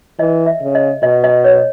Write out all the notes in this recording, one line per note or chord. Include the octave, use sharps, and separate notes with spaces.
E3 D#5
E5
C#3
D#5
B2 D#5
D#5
C#5